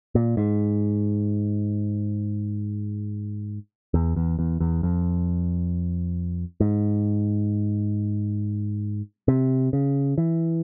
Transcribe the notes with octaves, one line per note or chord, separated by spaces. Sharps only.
A#2
G#2
E2
E2
E2
E2
F2
G#2
C3
C#3
E3